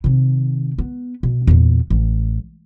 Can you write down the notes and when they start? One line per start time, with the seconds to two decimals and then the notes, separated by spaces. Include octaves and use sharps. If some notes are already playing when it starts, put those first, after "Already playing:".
0.04 C3 D#3
0.78 B3
1.23 B2
1.47 E2 A#2
1.90 A1